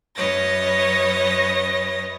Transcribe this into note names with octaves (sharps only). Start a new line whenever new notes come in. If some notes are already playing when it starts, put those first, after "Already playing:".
F#2 B4 C#5 D#5 A6 A#6